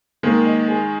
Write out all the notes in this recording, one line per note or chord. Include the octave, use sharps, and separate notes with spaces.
D#3 G#3 A#3
D#5
G#4